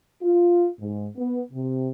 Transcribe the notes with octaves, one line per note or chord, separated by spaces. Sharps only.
F4
G#2
B3
C3